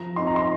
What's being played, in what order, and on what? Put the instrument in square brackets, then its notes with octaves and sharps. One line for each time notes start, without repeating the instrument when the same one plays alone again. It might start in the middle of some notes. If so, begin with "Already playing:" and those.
Already playing: [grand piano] F3 A#5
C4 D#4 C6
A#5
C6